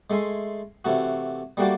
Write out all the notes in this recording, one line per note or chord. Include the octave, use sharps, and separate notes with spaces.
G#3 A3 E5 G#5 C6
C3 E3 A3 F#4
G3 A3 A#3 F#4 G4 D5